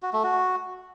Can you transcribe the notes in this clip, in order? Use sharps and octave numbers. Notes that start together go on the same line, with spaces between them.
F#4
A3
F#4